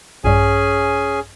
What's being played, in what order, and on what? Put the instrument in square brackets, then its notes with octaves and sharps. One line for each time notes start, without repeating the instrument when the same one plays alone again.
[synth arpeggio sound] A#1 G2 [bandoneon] C#4 G#4 G#5